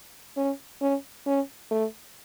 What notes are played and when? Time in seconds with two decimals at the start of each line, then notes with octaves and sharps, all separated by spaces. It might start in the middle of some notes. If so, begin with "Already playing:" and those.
0.37 C#4
0.81 C#4
1.26 C#4
1.71 A3